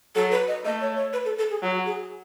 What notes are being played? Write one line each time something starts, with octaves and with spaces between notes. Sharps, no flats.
F#3 A4
B4
D#5
A3 D#5
C#5
C#5
B4
A4
A4
G#4
F#3 F#4
G#4